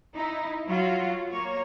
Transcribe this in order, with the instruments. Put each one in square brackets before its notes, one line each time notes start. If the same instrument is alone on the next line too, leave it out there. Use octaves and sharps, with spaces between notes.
[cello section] D#4 E4
F#3 F4 F#4
A#3 C#5